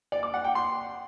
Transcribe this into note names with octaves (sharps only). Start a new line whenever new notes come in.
D5
D6
F#5
G5
C6